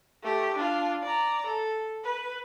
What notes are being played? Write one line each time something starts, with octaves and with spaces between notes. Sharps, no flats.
A3 G4
D4 F4
D5 A#5
A4
B4